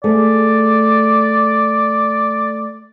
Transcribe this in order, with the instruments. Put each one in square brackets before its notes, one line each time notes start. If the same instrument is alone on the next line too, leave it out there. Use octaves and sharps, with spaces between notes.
[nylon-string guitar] A3 G#4 G#5 [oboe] D5